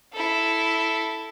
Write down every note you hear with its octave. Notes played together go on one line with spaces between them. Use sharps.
E4 A4